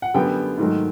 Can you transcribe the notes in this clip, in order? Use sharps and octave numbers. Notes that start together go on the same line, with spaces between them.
F#5
F#2 D3 G3 B3 G5
G#2 D#3 F#3 A3